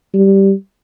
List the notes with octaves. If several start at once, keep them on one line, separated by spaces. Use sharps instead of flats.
G3